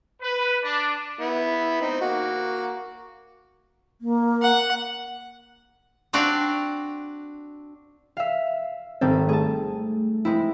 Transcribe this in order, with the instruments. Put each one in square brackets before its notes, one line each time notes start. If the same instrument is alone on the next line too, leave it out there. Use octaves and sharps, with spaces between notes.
[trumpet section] B4
D4
[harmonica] B3 E4
C4 D#4
A#3 F#4
[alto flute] A#3
[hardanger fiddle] F#5
[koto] C4 D4 F#4 D5 F5
[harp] E5 F5
[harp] G#1 G3 A4 [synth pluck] C4
[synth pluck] A3 [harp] G#4 A5
[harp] G#3 C4 E4